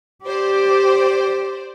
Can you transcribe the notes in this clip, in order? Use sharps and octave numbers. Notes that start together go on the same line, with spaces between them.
G4 C5 D5